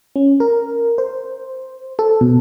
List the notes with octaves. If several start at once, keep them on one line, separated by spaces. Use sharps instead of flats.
C#4
A#4
C5
A4
B2